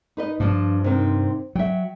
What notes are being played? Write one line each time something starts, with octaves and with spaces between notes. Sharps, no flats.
D#4 B4 D#5
G2 F3 D4 F4
C3 D#3 C4
F#3 E5 G5